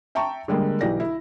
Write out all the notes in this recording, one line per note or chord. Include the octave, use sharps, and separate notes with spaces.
E5 G5 A5 A#5 C#6
D3 G3 G#3 A#3
B1 E3 G4 D5 A#6
E4